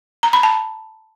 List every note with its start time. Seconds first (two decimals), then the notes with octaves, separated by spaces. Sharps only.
0.23 A#5
0.33 B5
0.43 A5